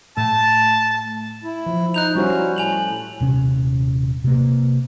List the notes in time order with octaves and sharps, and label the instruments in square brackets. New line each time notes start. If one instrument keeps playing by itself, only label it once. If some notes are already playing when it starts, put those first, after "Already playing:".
[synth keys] A2 A3 [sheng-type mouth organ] A5
[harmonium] E4
[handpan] F3
[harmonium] D#4 [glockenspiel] F#6 G6 F7
[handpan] G3 E4 C5 [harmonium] C#4 F#4
[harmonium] A2 [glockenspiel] G#5 F7 F#7
[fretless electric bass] D#1 C3 C#4
C3 A#3